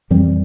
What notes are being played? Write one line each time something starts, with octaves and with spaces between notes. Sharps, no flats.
F2 E3 G3 C4